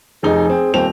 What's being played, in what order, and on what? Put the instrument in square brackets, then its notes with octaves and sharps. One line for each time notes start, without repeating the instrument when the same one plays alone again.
[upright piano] F1 D#4 [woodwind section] G#4
[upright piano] C4
[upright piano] D#1 C4 F7 [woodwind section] F2